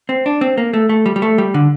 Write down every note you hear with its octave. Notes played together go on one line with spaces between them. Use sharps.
C4
D4
C4
A#3
A3
A3
G3
G3
A3
G3
D3